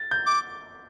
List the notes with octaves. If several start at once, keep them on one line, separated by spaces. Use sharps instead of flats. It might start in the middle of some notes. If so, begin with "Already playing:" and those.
Already playing: A6
G6
D6